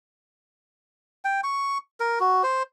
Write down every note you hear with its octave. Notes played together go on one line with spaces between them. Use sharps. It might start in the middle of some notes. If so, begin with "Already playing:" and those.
G5
C#6
A#4
F#4
C5